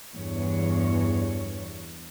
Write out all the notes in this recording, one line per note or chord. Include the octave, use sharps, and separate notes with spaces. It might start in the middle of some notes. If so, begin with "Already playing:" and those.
E2 G2 C#5